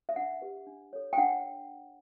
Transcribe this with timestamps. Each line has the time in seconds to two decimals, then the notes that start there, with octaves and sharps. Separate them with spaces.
0.09 E5
0.16 D4 F#5
0.42 G4 B4
0.67 D4
0.93 A4 C#5
1.13 G5
1.18 D4 F#5